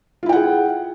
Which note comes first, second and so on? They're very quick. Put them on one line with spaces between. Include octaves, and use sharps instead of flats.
F4 E4 G5 F#5 G#4